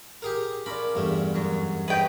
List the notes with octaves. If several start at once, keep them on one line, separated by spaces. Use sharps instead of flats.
G4 G#4 A#4
C#4 F4 A#4 D5 B5
E2 G2 A3
F#2 F#3
G#4 B4 C#5 D#5 G5